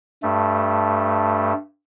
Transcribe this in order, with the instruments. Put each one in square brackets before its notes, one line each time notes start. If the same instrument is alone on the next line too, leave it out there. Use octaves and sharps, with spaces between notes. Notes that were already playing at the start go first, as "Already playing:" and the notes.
[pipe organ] G2 A3